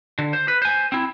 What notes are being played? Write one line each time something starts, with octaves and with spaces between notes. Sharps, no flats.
D3
C5
B4
C5 G#5
C4 E4